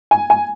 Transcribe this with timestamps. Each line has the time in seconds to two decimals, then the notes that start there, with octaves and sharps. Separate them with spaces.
0.11 G#5
0.30 G#5